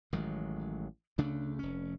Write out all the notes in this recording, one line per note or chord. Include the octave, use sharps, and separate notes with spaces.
A1 D#3 F#3 G#3
D2 C#3 A3 D4
F1 C#4